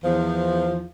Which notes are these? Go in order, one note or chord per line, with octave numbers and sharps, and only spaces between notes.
E2 F3